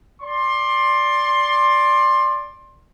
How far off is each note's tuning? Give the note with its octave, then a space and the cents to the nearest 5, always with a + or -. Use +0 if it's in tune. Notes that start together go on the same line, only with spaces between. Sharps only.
D5 +0 C6 +20